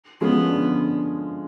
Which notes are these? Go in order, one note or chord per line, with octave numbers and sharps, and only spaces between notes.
F3 G#3 B3 C#4
D3